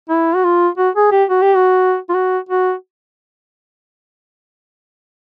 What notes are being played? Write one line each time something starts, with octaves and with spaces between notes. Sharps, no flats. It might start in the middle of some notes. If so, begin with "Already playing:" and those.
E4
F#4
F4
F#4
G#4
G4
F#4
G4
F#4
F4
F#4
F#4